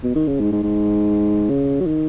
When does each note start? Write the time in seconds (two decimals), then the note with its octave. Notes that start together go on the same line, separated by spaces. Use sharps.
0.04 B2
0.15 D#3
0.28 C#3
0.40 G#2
0.52 G#2
0.64 G#2
1.50 C#3
1.80 F#3
1.87 D#3